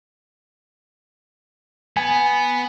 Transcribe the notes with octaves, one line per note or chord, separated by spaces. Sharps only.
B3 G#5